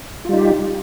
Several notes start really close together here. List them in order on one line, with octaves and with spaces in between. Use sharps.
F4 G3 D#4 G4